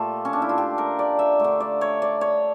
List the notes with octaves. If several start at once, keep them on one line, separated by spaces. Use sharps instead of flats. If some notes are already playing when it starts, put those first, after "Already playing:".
Already playing: A#2 A3 F4 G4 A4
C#4
D4
E4
F4
G4
A#4
D5
E5
D3 A3
D5
C#5
D5
C#5